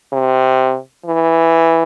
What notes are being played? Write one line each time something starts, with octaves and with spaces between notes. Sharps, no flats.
C3
E3